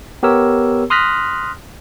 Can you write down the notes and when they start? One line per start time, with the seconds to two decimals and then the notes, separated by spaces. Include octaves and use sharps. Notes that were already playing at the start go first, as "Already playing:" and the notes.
0.23 B3 G4 A#4 C#5 E6
0.90 C6 D#6 F6 F#6 A#6 B6